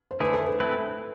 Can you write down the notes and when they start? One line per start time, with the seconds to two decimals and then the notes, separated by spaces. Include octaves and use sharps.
0.11 C5
0.20 D3 A3 E4 G#4 B4
0.33 A4
0.42 B4
0.48 A4
0.60 A3 C4 E4 B4